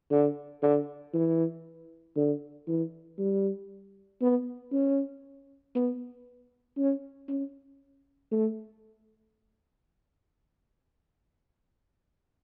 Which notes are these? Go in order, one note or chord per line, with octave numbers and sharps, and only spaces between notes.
D3
D3
E3
D3
E3
G3
B3
C#4
B3
C#4
C#4
A3